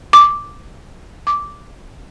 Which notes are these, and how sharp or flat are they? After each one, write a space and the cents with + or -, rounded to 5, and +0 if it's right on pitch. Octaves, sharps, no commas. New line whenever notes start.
D6 -5
D6 -10